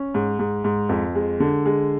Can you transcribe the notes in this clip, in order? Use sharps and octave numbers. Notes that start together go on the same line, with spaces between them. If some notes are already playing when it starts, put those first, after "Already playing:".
Already playing: C#4
G#2
G#2
G#2
F2
G#3
D3
G#3